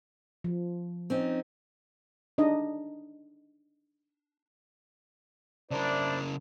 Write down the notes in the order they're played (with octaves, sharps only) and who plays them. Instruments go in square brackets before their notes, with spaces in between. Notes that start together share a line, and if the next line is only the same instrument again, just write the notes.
[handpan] F3
[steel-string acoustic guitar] C4 C#4 D#4
[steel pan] D4 D#4 D#5
[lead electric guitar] C#3 A#4 [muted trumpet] D4 [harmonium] E4 C5 D5